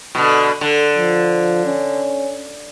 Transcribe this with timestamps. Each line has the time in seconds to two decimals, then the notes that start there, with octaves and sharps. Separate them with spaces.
0.15 B2 D3
0.61 D3
0.98 F3
1.66 C#4